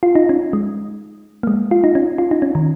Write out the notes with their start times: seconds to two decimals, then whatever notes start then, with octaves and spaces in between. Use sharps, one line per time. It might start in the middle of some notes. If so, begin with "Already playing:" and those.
0.03 F4
0.15 D#4
0.29 C#4
0.53 G#3
1.43 A#3
1.47 G#3
1.71 F4
1.84 D#4
1.95 C#4
2.18 F4
2.31 D#4
2.42 C#4
2.55 D#3